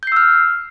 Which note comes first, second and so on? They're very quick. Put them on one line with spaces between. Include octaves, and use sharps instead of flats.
G6 C7 E6 F6